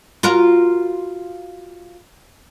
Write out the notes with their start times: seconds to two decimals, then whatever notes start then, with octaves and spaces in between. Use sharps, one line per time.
0.23 F4 F#4 A#4